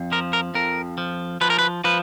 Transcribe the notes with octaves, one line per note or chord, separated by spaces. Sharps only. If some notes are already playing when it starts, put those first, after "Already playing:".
Already playing: F2
F3 A#4
A#4
F2 A#4
F3
F3 B4
A#4
B4
F3 B4